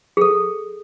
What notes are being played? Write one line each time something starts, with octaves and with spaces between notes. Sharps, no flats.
G#4 A4